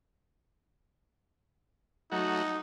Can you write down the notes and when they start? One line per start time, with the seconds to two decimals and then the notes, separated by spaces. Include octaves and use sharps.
2.12 F#3 A3 D#4 F#4